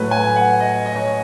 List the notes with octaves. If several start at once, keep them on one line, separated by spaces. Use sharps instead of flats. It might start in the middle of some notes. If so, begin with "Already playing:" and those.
Already playing: A2 F#3 A3 B4
G#5
F#5
D#5
D#5
C#5